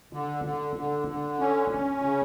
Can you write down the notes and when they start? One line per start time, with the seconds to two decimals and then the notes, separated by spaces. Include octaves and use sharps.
0.13 D3
0.45 D3
0.76 D3
1.08 D3
1.39 C#4
1.71 C#4
2.02 C#3